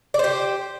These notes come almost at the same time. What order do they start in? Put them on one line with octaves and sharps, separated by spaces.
D5 C5 G4